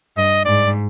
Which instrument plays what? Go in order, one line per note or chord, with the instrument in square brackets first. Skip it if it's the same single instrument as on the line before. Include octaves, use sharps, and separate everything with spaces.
[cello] G2 [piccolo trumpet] D#5
[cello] G#2 [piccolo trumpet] D5